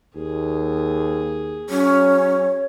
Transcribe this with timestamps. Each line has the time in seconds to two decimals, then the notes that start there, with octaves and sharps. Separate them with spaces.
0.15 D#2 G#4
1.70 F#3 C#4 C#5